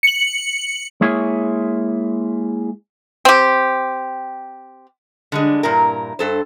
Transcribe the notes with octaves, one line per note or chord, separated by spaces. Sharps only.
C#7 F#7
G#3 A#3 E4 G#4 C#5
C4 G4
D3 G3 G#3
G2 A#2 E4 A#4
G2 A4 C5